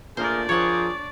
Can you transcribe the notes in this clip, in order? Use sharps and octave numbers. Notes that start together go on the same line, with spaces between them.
A#2 A3 D4 G#4 A#4 C5 D5
F3 G#4 A#4 C5 C#5 F#5